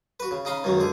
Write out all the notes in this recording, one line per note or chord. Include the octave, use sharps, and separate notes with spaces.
F#4 B4
C#3
C#3 D#4 D#5 F5 B5
C#2 F#2 D#3 F#3
C#2 D3 G#4